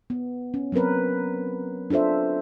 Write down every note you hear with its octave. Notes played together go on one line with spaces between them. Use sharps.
B3
C#4
F#3 B3 C4 A#4 B4
D4 F4 A4 C5 E5